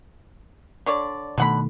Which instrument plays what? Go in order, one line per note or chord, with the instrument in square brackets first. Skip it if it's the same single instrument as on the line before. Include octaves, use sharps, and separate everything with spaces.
[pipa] D3 C#5 D5
[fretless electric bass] B2 D#3 A3 [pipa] D3 F#5 B5